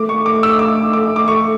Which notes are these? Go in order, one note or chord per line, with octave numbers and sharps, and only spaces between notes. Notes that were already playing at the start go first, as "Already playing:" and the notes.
Already playing: A3 D6
C#6
D6
E6
D6
D6
D6
C#6